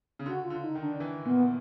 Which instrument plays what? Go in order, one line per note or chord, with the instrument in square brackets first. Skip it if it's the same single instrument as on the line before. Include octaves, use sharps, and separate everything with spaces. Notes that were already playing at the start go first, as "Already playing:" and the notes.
[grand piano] C#3
[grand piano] D3 [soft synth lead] F#4
[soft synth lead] F4
[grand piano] D3
[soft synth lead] D#4
[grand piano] D#3
[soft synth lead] D4
[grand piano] E3
[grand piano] A#2 [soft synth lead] B3